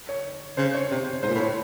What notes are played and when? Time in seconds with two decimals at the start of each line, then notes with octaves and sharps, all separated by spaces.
0.09 C#5
0.57 C#3 C5
0.74 C#5
0.91 C3 C5
1.23 G#2 C5
1.29 A#2
1.35 A2
1.40 C#5